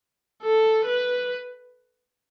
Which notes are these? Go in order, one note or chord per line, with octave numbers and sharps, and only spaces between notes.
A4
B4